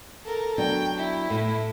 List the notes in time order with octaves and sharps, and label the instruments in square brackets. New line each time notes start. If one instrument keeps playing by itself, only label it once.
[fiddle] A4 A#4
[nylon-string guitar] F#3 B3 D4 [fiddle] G5
[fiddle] E4
[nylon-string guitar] A2